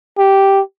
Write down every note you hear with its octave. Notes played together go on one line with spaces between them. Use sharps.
G4